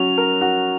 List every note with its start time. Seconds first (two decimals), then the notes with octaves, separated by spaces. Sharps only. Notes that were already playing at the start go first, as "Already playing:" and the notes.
Already playing: F#3 C#4 F#4 F7
0.18 A#4
0.41 F#4